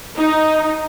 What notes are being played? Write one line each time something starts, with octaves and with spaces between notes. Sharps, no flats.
D#4